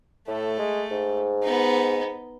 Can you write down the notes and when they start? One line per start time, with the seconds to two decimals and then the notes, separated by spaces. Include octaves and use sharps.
0.28 A2 A3
0.59 G#3
0.91 G#2
1.43 B3 D#4